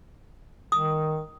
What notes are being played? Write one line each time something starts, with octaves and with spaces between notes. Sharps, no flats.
D#3 D#6